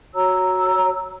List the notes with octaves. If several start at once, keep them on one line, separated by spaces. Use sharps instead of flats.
F#4 C#5 A#5 E6